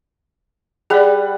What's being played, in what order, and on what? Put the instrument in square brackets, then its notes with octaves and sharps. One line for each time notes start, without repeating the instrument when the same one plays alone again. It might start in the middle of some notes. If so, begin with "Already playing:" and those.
[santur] G3 B4 F#5 [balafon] G#4 D5